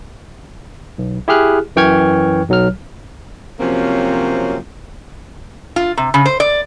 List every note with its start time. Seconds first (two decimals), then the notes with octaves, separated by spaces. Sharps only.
0.98 B1
1.28 E4 G4 G#4 F6 F#6
1.76 F#2 E3 G5 C#6 F6 G#6
2.49 B1 F#3 F6
3.59 C3 F3 F#3 A#3 C4 C#4
5.76 F4
5.97 C3
6.14 C#3
6.25 C5
6.40 D5